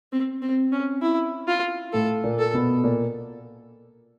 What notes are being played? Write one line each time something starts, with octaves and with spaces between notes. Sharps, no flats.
C4
C4
C#4
E4
F4
A2 A3 A4
A#2 A#3
A4
B2 B3
A#2 A#3